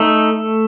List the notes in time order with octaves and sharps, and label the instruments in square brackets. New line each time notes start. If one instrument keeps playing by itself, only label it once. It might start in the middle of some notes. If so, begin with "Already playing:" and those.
Already playing: [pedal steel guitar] A3 D#4